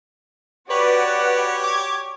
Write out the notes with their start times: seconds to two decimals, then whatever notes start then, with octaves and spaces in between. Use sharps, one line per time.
0.70 F#4 G4 B4 C#5 D5 F#5
1.64 D6 G#6